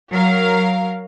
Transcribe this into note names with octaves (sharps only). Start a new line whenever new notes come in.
F#3 A#4 F5